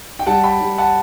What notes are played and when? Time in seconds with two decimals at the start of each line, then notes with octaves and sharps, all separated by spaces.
0.19 G5
0.26 G3 F#5 A5
0.44 G5 B5
0.60 G3
0.78 F#5 A5